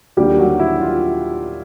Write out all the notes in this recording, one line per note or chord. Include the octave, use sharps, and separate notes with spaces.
D#2 D3 F#3 G3 A#3 G4
F#3 F#4
E4
F4